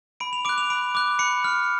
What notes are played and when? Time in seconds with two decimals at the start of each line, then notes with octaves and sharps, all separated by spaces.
0.20 B5 D7
0.33 F7
0.45 D6 D7
0.49 F#6
0.58 F7
0.70 B5 D7
0.95 D6 F#6
1.19 B5 C#7
1.44 F6